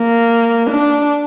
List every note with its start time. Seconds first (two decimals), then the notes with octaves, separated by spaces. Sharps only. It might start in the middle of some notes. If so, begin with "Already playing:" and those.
Already playing: A#3
0.70 D4